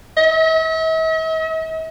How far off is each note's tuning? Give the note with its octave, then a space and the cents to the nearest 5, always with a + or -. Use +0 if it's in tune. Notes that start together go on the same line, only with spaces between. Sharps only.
E5 -45